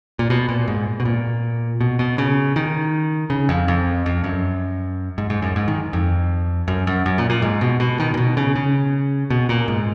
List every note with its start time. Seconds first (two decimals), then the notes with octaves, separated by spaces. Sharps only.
0.19 A#2
0.30 B2
0.49 A#2
0.68 G#2
1.00 B2
1.05 A#2
1.81 B2
1.99 B2
2.18 C#3
2.56 D#3
3.30 C#3
3.49 F2
3.68 F2
4.06 F2
4.24 F#2
5.18 G#2
5.30 G#2
5.42 F#2
5.56 G#2
5.68 D#3
5.93 F2
6.68 F#2
6.87 F#2
7.06 F#2
7.18 A#2
7.30 A#2
7.42 G#2
7.61 B2
7.80 B2
8.00 D#3
8.14 A#2
8.17 B2
8.37 C#3
8.55 C#3
9.30 B2
9.49 A#2
9.68 G#2